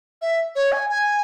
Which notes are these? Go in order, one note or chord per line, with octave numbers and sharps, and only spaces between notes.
E5
C#5
G#5
G#5